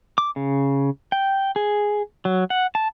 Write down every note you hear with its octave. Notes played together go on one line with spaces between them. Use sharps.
D6
C#3
G5
G#4
F#3
F#5
A5